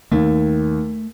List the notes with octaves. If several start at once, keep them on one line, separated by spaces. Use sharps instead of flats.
D#2 A3